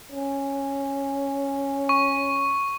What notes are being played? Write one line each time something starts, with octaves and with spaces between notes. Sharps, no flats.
C#4
C#6